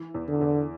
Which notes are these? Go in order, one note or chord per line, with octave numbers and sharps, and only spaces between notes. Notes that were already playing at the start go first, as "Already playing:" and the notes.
Already playing: E3
E2
D3
E2